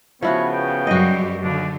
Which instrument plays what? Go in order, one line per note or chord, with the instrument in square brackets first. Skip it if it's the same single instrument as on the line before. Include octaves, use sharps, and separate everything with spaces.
[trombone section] C#3 B3 [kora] F3 E4 F#4 [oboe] C#5
[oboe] G5
[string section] F#2 G3 [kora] F#4 D#5
[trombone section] D#2 [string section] D3 [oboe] D4